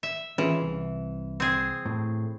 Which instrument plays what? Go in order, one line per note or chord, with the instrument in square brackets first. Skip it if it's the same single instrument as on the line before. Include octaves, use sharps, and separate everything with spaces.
[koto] E5
[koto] E3 [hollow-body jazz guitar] G#3 C#4 F4
[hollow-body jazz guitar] C2
[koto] C4 G#4
[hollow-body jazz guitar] A2